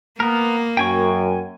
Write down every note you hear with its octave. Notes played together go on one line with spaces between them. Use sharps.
A#3 B3 A#4
F#2 G5 G#5 C#6